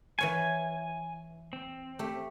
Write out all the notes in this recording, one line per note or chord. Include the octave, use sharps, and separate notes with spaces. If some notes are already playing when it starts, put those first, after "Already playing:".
E3 C#5 F5 G#5
C4
A3 G4